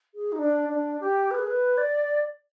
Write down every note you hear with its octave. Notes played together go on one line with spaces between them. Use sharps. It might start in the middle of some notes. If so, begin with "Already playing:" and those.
G#4
D#4
D4
D4
G4
B4
G#4
B4
D5